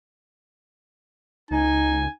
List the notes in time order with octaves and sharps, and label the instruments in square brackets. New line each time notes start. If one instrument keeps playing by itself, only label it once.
[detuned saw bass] C#2 [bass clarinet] D#4 [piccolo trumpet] G#5